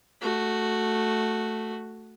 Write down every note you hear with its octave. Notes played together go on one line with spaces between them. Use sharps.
A3 F#4